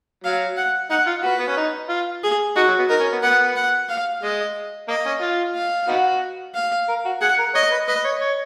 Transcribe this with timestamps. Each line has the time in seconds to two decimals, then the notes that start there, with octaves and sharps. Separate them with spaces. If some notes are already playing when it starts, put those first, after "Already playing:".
0.24 F#3 F5
0.57 F#5
0.90 D#4 F#5
1.07 F4
1.23 F#4 B4
1.39 B3
1.48 C#4
1.57 D#4
1.89 F4
2.23 G#4
2.56 D#4 F#4
2.68 F#3
2.79 B3
2.89 D#4 A#4
3.00 C#4
3.12 B3
3.22 B3 F#5
3.56 F#5
3.89 F5
4.23 G#3 D#5
4.88 A#3 D#5
5.06 C#4
5.22 F4
5.55 F5
5.89 B3 D#4 F#4
6.55 F5
6.89 A#4
7.05 F#4
7.21 G#4 F#5
7.39 A#4
7.54 C#5 D#5
7.71 B4
7.88 B4 D#5
8.04 C#5
8.21 C#5